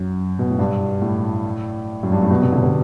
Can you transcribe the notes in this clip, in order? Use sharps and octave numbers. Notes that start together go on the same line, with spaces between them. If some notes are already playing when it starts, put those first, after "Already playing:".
Already playing: F#2
B2
A2
G2
A2
F#2
G2
A2
B2
C3
D3
C3